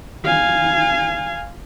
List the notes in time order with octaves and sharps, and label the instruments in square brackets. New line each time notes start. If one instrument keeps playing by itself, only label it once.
[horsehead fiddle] F5 G#5